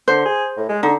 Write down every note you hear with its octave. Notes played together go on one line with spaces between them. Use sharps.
D3 C5
G#4
A2
G#3
D3 D#4